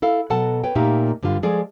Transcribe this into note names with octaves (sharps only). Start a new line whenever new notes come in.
E4 A4 F5
B2 F#3 A4 F#5 A5
B4 C#5 G5
A#2 A3 A#3 D#4 G4 E5
G2 D3 G3 F4
F3 G#3 G#4 A4 D5